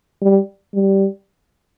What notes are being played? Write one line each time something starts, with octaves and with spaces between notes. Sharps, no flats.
G3
G3